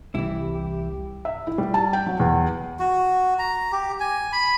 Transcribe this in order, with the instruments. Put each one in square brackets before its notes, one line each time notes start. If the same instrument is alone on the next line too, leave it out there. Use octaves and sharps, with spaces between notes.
[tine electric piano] C2 [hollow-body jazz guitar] E3 E4 [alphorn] G4
[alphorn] G4
[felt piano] E5
E4
G3
A5
G5
F#3
E2
[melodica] F#4
A#5
G4
G#5
B5